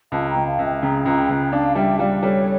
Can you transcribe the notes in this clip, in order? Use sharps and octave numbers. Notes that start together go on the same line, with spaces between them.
C#2 F5 A5
A5
G5 A#5
C#2
F5 A5
C#2
E5 G5
C#3 G5 A#5
C#2
C#2
D4 F5 A5
G3 E5 G5
G3 D5 F5
G3 A4 C#5